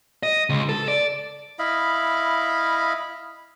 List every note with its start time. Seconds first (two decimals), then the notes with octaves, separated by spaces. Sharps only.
0.23 D#5
0.49 C#2
0.69 A4
0.88 D5
1.59 E4 D#5 F5 B5